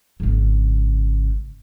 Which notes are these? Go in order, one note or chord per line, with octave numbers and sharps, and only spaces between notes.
G#1 C#3